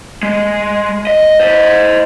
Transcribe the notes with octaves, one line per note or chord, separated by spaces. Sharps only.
G#3
D#5
C5 D#5